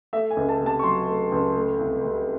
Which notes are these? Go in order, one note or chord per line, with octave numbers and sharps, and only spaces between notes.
A3 E5
G#5
C#2
A5
C3
A5
C#6
F#3 C6
A3
C#2
A3
C2
C3